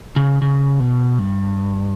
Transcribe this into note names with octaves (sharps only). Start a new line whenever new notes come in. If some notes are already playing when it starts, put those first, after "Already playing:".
C#3
C#3
B2
G2